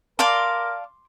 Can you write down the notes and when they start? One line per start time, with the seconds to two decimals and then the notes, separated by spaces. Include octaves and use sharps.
0.19 A#4 D5 F5 A5 C6 D6